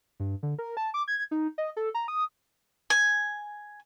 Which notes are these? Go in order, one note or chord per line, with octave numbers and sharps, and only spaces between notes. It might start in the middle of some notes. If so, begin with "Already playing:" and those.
G2
D3
A#4
A5
D6
G#6
D#4
D#5
A4
A#5
D#6
G#5